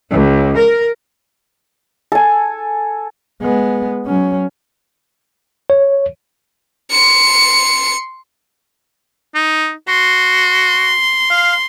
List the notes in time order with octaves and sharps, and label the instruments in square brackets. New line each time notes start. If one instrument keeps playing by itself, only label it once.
[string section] C#2
A#4
[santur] A4 G#5
[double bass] G#3 B3
F#3 C#4
[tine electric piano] C#5
[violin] C6 C#7
[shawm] D#4
[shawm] F#4 [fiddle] C6
[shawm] F5